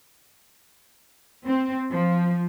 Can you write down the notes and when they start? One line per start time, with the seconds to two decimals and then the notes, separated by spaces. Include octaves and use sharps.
1.46 C4
1.92 F3